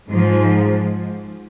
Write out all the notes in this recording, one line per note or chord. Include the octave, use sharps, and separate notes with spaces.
G#2 F3